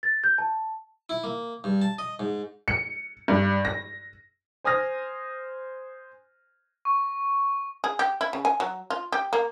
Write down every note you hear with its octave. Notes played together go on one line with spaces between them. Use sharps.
A6
G6
A5
E4
A#3
G2
A5
D#5
G#2
C#7
G2
A#6
C5 G#5 D#6 F6 A#6
C#6
G#4
G4
E4
C#3
G#5
F#3
F4
G4
A#3